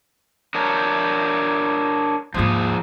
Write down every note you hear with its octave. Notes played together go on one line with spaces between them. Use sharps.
D4 A#4 C#5
D#2 G#2 F3 G#4